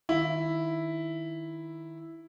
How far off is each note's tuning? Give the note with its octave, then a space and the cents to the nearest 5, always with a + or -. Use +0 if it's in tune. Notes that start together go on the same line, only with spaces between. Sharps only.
D#3 +0 E4 +0